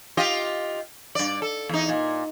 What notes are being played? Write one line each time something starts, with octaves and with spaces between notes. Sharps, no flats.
F4 G4 D#5
G2 D5
A4
E2 D#4
A#2